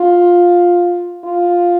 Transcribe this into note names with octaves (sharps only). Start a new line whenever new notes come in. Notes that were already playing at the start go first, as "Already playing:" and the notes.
Already playing: F4
F4